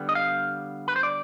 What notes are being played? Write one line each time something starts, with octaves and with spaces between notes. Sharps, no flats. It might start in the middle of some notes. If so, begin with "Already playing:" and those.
Already playing: D3 G3 B3
D#5
F5
B4
C5
D5